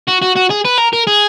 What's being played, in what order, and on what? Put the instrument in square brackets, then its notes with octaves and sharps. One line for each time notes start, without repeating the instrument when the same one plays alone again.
[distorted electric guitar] F#4
F#4
F#4
G#4
B4
A#4
A#4
G#4